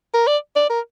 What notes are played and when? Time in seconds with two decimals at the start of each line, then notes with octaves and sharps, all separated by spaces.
0.14 A#4
0.27 D5
0.56 D5
0.70 A#4